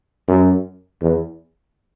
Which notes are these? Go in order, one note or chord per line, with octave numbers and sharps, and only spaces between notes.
F#2
E2